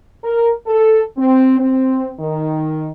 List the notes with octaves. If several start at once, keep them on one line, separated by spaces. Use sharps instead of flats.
A#4
A4
C4
C4
D#3